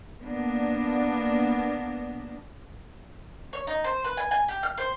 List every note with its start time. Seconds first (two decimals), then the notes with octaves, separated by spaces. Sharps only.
0.20 A#3 B3 D4
3.53 C#5
3.67 D#4
3.84 C5
4.04 B4
4.17 G#5
4.31 G#5
4.48 G4
4.63 F6
4.78 C5